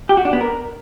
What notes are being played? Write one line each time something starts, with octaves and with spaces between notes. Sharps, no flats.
G4
F#4
D4
B3
A#4